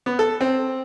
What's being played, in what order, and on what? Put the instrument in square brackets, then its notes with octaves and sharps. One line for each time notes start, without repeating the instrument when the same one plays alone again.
[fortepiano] B3
A4
C4